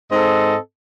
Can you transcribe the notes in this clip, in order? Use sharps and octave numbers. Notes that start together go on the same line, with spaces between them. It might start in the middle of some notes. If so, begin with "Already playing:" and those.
G#2 C4 A4 D#5